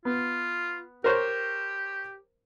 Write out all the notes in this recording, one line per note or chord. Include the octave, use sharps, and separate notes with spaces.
B3 F4
G4 A#4 C5 C#5